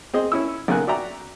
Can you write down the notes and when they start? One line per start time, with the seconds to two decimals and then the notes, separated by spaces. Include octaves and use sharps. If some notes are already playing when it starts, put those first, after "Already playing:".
0.14 C4 G#4 D#5
0.32 C#4 E4 E6
0.68 B1 C#3 A#3 G#5 F#6
0.87 F#4 D5 E5 G5 A#5